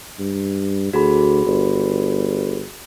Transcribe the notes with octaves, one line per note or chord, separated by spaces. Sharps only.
G2
D2 F#4 G#4 B5
G1